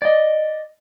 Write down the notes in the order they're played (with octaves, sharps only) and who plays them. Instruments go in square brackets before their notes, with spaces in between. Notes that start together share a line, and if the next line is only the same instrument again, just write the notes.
[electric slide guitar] D5 D#5